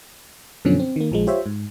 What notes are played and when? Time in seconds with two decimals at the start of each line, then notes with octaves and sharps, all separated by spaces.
0.65 F#2 B2 D3 F3 F#3 C#4
0.80 C4
0.96 D#3 A#3
1.12 A#1 F3 G#3
1.27 F4 G4 C5 C#5 E5
1.46 G#2